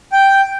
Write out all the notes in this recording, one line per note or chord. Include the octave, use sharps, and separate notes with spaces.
G5